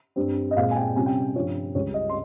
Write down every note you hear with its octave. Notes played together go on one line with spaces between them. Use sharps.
G2 G3 C4
D#5
A#2 G#3 C4 F5
G#5
G5
C3 G3 C#4 F4 G#5
G5
G2 F3 C4 F4 C#5
C#2 C#3 G3 C#5
D#5
C6